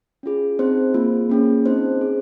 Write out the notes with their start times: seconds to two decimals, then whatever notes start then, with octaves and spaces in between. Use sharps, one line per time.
0.23 C#4 F4 G#4
0.59 C4 D#4 G#4 C5
0.94 A#3 F4 G#4
1.30 A#3 C#4 F4 G#4
1.66 C4 D#4 G#4 C5
2.01 C#4 F4 G#4